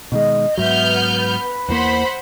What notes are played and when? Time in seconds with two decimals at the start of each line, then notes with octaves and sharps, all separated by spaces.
0.12 B2 D#3 G#3 D#5
0.57 G#2 F#3 B3 E5 F6 G6
1.07 B4
1.69 E2 E3 A#3 C5 F#5 B5